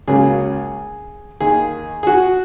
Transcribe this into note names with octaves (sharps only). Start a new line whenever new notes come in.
C#2 C#3 F#3 A#3 G#4
D#2 D#3 A#3 G#4
G#4
F#4